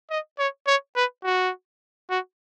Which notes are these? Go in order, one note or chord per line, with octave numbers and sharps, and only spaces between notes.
D#5
C#5
C#5
B4
F#4
F#4